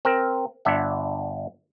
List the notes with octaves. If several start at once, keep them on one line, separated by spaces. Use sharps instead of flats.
C4 A#4
G1 D4 E5 F#5